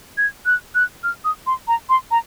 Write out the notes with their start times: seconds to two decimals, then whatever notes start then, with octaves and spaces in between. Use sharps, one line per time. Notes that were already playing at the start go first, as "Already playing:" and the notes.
0.18 G#6
0.46 F#6
0.75 F#6
1.03 F6
1.24 D#6
1.47 C6
1.68 A#5
1.89 C6
2.11 A#5